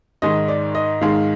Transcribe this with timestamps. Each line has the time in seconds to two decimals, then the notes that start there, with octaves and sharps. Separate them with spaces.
0.22 G#2 D#3 G#3 D#5
0.48 D5
0.75 D#5
1.01 G#2 D#3 G#3 F5